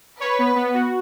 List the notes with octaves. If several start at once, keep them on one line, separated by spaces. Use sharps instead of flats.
B4 C#5
B3
B3
F#4